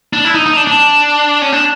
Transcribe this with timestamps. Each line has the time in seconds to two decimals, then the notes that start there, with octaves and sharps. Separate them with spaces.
0.13 D4
0.25 E4
0.35 D#4
0.46 D#4
0.57 D4
0.67 D4
1.42 C#4
1.52 D4